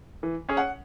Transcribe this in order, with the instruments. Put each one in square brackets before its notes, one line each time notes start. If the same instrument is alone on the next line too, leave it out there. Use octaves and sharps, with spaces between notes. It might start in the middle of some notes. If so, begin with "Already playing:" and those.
[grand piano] E3
C#4 G#4 C#5
[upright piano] F#5